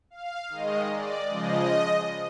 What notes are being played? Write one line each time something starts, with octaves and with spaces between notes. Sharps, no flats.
F5
D#3 G#3 D#5
D5
C#3 F3 G#3 D#5